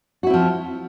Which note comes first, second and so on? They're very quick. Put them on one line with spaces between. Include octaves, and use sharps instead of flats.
F#4 E4 C4 F3